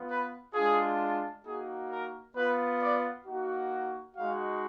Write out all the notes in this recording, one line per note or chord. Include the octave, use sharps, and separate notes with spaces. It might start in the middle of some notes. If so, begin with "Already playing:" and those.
Already playing: B3 F4
B4
G#3 D4 F4 G#4
A#3 D#4 F#4 G#4
A#4
B3 F4 B4
D5
A#3 D#4 F#4
G#3 D#4 F#4 F5